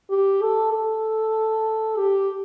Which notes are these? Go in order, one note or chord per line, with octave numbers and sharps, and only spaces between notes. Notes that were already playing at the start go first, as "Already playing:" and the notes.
G4
A4
A4
G4